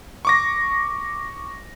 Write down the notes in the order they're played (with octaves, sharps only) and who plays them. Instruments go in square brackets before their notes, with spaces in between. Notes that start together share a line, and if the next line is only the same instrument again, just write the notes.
[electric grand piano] C#6 D6 A#6